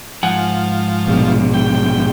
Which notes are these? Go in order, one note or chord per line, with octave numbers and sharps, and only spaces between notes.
G#2 F3 F#5 G#5
A#1 B2
G5